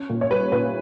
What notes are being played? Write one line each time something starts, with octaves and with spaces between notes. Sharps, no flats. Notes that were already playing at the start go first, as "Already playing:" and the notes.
Already playing: C#4
A#2
C#5
G3 B4
A#2 B4